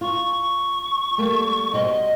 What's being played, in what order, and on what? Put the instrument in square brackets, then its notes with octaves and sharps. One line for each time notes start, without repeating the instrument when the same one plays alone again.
[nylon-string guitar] F4 [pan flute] C#6
[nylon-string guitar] G3 A3 A#3
[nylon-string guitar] B2 G3 C5 [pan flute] D#5